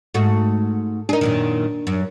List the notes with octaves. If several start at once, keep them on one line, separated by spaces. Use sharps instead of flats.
G#2 A3 F#4
D4 D#4 G#4 A#4
F#2 A#2 D#3
F#2